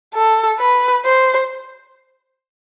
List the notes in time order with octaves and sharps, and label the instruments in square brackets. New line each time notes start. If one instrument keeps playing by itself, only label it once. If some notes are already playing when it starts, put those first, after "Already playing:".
[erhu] A4
B4
C5